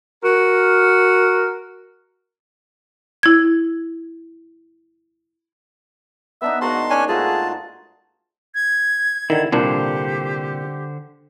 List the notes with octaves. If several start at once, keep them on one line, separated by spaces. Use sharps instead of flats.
F#4 A#4
E4 G#6
B3 D4 D#4 E5
G#2 A#3 F#4 A5 A#5 C6
C#4 D4 G#5
G#2 A3 F4 F#4 G#4 A5
G#6
D3 D#3 E4
C2 A#2 D3 D4 G4 C5